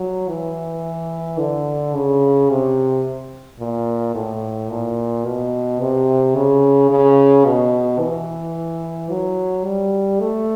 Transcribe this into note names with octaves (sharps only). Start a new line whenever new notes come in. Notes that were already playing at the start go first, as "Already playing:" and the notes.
Already playing: F#3
E3
D3
C#3
C3
A#2
A2
A#2
B2
C3
C#3
C#3
B2
E3
F#3
G3
A3